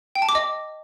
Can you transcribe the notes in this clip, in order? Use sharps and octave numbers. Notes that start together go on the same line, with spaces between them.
G5
A5
D6
D#5